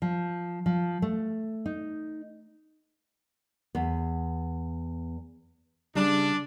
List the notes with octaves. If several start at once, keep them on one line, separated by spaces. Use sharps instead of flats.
F3
F3
A3
D#4
E2 B3
C#3 G3 D4